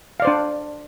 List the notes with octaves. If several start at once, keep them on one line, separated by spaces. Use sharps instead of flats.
D4 C5 D5 F5